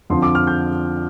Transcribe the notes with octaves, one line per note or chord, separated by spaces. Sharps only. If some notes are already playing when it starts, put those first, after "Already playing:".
F2 D3 F3 C4 C6
D6
F6
G6